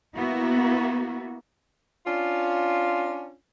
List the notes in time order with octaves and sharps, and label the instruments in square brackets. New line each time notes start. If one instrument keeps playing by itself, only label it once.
[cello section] A#3 B3 E4 F#4
[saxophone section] C#4 D4 F4